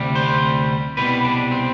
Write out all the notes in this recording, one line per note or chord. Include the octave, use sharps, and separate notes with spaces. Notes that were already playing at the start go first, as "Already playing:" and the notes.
Already playing: D2 C3 G3
C5
C2 B2 G3 B4
D4
C4